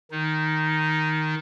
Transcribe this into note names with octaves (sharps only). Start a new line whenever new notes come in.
D#3 D#4